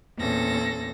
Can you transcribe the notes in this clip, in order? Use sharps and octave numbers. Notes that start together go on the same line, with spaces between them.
E2 A#2 C4 C#4 A4 A#6